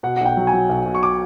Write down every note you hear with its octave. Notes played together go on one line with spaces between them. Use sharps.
B2 F#5
F#5
B1 G5
F#3
G#5
F#3
B1
B2
C#6
D6